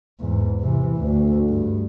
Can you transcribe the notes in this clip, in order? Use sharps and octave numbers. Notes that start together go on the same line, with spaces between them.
E2 G#2
C3 E3
D2
G2